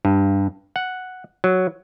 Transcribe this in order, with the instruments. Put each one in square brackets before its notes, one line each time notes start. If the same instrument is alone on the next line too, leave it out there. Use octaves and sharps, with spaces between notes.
[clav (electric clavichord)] G2
F#5
F#3